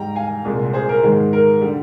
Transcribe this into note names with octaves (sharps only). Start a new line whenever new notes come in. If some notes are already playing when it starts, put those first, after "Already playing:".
Already playing: G#2 G3 G5 A#5
F5 G#5
C2 A#2 G#3
G#4 C5
A#4
G#2 D#3 G#3
A#4
D3 G3